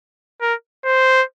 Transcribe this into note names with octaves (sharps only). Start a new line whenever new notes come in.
A#4
C5